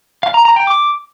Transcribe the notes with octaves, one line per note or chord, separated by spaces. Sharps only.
F5
A#5
A#5
G5
D6